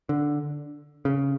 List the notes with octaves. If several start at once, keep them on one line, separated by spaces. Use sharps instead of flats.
D3
C#3